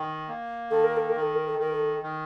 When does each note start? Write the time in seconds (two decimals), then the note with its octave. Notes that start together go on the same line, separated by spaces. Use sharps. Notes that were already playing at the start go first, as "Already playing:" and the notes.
Already playing: D#3
0.28 A#3
0.71 D#3 A4
0.84 A#4
0.97 A4
1.09 A#4
1.15 D#3
1.22 A4
1.35 A#4
1.48 A4
1.59 D#3 A#4
1.73 A4
2.03 D#3